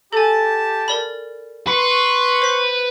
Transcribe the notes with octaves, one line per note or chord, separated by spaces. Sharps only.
G4 A4 G#5 A5
A#4 D5 B5
B4 C6 C#6
C5 B6